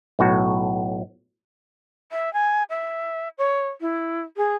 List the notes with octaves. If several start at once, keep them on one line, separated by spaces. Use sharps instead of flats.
B1 A2 F#4
E5
G#5
E5
C#5
E4
G#4